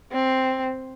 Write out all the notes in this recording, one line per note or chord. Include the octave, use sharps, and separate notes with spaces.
C4